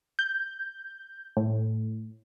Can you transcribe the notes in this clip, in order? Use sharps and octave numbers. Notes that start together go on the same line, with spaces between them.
G6
A2